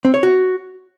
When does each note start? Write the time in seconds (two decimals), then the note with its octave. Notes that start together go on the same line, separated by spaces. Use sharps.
0.05 C4
0.14 C#5
0.23 F#4